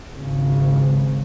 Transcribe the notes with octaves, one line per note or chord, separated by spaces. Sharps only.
G#1 C#3